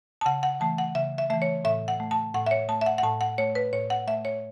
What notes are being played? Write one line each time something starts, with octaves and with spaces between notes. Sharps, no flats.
A5
C#3 F#5
F#5
E3 A3 A5
F#5
C#3 E5
E5
E3 A3 E5
C#5
A2 E5
F#5
A3
A5
A2 F#5
E5
C#5
A3 A5
E5
F#5
F#5
A2 A5
F#5
A3 C#5
B4
A2 C#5
F#5
A3 E5
C#5